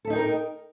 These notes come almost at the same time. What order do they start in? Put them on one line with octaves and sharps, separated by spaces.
A4 E5 D#4 G5 A#4